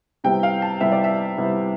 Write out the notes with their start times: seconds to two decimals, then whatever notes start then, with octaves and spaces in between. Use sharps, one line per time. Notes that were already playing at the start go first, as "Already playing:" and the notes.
0.24 C3 G3 B3 E4 G5
0.43 F5
0.62 A5
0.80 C3 G3 B3 E4 E5
0.92 D5
1.04 E5
1.38 C3 G3 B3 E4